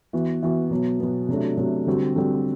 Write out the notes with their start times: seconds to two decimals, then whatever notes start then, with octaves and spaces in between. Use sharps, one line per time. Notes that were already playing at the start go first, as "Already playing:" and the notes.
0.13 E3 B3 F#4
0.43 E3 B3 F#4
0.70 B2 F#3 B3
1.00 B2 F#3 B3
1.28 C3 F#3 A3 D4
1.57 C3 F#3 A3 D4
1.87 D3 G3 C4 F#4
2.16 D3 G3 C4 F#4